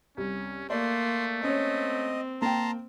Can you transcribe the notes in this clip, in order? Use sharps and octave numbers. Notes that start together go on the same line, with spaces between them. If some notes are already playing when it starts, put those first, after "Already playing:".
C2 C#4
A3 A#3 D5 C6
C4 C#4 C#5 D#5
A#3 G5 A5 A#5 C6